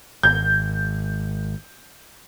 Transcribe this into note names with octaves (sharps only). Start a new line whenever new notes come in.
G#1 G6